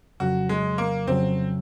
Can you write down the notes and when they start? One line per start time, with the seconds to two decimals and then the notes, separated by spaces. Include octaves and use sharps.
0.20 F2 C#3 F#3 F#4
0.49 G#3
0.78 A#3
1.07 F2 C#3 F#3 C4